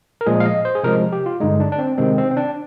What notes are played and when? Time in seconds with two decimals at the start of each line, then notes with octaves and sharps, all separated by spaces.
0.21 A#4
0.26 A#2 F3 G#3 G#4
0.40 F5
0.45 D#5
0.65 C5
0.75 G#4
0.83 C3 F3 G#3 A#4
1.13 G4
1.26 F4
1.40 G2 D3 G#3 D#4
1.60 D4
1.72 D4
1.79 C4
1.98 C3 D#3 G#3 C4
2.18 C4
2.31 C4
2.37 D4